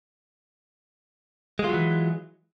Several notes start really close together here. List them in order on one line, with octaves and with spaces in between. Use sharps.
G#3 F4 F#3 E3